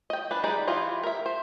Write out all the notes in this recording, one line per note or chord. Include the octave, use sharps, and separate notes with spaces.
D#5 G5
D4 B4
G3 D#4 G4 G#4 D5
E3 F4 G4 D#5
A#4 E5
C5